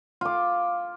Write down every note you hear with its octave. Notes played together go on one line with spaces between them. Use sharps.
F4 D6